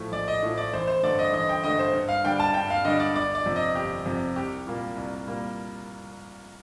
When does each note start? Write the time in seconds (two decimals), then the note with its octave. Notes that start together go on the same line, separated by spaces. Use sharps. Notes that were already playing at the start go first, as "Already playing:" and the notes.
Already playing: A#1 A2 F3 A3
0.12 A#1 D5
0.28 D#5
0.42 A2 F3 A3
0.58 D5
0.73 A1 C5
0.88 C5
1.03 G2 D3 A3 D5
1.19 D#5
1.33 A1 D#5
1.49 G5
1.64 G2 D3 A3 D#5
1.79 C5
1.93 G2
2.09 F5
2.24 D3 G3 D4 G5
2.40 A5
2.54 G2 G5
2.70 F5
2.85 D3 G3 D4 D#5
3.00 D5
3.15 G1 D5
3.35 D5
3.46 F2 C3
3.56 D#5
3.75 G1 G4
4.06 F2 C3
4.36 C2 G4
4.67 A#2 G3 A#3
4.96 C2
5.27 A#2 G3 A#3